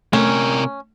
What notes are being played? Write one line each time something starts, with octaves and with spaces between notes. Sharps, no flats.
C3 A3 C#4 A#4